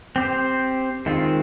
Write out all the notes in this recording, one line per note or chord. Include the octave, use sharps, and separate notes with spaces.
C4 G4 C5
D#3 G#3 C4 F4